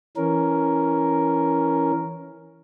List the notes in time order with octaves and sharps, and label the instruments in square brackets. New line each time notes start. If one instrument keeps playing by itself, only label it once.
[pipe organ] E3 C#4 A#4